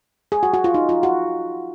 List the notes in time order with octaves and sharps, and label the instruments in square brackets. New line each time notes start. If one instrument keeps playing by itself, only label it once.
[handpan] G#4
F#4
F#4
F4
D#4
F4
F#4